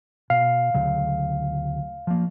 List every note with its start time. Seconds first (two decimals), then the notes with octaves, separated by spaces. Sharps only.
0.30 B2 F5
0.74 D2 C#3 F#3
2.07 F3 A#3